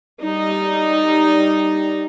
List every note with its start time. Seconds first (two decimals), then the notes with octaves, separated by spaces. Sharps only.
0.24 G3 D#4